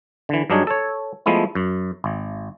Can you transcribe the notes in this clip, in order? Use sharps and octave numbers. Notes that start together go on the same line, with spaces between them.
D3 E3
G2 F#3 D4 D#4 G#4 C#5
A4 C#5
F3 G#3 A3 B3 E4
F#2
G#1